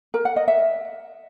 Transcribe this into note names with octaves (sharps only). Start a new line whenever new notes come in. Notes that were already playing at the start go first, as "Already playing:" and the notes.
A#4
F#5
D#5
E5